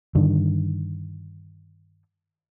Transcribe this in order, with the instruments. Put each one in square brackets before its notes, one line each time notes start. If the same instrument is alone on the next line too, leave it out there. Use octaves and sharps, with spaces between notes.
[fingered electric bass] G2 D3 D#3